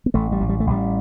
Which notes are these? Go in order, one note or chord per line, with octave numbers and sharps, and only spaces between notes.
B3
A1 A3
G3
A1
G3
A3
A1 G3